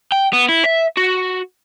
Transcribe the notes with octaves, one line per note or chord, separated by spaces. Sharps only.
G5
B3
E4
E5
F#4